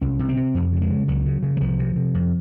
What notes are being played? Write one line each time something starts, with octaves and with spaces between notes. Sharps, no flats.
C2 C#4
C3
C4
C3
F2
C#3 F#3
G#3
C#3
C#2 F#3
C#3
C#3
F#3
C2 F3
C3
C3
F2